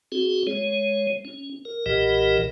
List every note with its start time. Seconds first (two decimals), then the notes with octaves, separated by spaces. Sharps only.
0.12 C4 F#4 G#4
0.47 G#3 C#5
1.25 C#4
1.65 A#4
1.86 B1 A#2 E3 G4 A#4 D#5